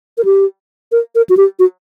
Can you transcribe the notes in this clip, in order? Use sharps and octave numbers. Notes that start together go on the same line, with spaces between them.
A#4
G4
A#4
A#4
F#4
G4
F#4